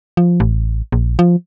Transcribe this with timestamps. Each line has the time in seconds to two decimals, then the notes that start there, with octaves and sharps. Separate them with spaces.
0.17 F3
0.40 A1
0.92 A#1
1.19 F3